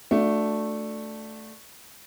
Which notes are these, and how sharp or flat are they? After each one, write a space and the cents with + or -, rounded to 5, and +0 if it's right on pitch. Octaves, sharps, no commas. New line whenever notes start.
A3 +0 D4 +0 F#4 -35